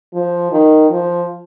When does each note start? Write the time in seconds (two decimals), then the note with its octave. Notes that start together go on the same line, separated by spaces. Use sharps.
0.13 F3
0.52 D#3
0.90 F3